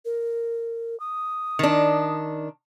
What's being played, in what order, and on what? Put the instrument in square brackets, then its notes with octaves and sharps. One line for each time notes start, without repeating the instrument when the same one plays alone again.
[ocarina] A#4
D#6
[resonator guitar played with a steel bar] D#3 D4